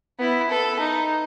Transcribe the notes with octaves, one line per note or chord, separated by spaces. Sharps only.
B3 E4
A4 B4
D#4